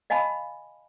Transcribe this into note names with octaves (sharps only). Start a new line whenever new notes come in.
D#5 F5 G#5 A5 B5